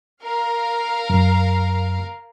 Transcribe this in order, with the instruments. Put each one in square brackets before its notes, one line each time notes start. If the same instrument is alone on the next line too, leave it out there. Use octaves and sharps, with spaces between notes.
[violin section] A#4 F5
[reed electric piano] F#2